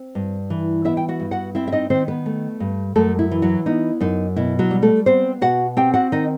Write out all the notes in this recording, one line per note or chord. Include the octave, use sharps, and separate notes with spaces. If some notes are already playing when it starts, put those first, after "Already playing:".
Already playing: C4
G2
E3
B3 E4 E5
G5
F#4 F#5
G2
F#4 F#5
C4 E4 E5
E5
D#4 D#5
D#3 C4 C5
B3 B4
A3
G2
F#2 A3 A4
E4
E3
F#3 F#4
B3 D#4
F#2 D#4
B2 E4
F#3 F#4
G3
A3 A4
B3 C4 C5
B2 F#4 F#5
C4 G4 G5
F#4 F#5
D#3 D#4 D#5